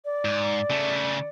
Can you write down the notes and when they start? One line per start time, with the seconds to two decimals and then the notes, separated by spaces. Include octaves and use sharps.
0.05 D5
0.25 G#2
0.70 C#3 A3